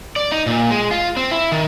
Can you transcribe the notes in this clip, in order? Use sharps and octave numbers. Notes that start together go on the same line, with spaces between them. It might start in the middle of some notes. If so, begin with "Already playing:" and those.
D5
D#4
A#2
G#3
F4
C4
E4
D#3